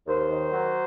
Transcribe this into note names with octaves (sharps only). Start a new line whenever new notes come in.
D#2 C5
D#3
F#3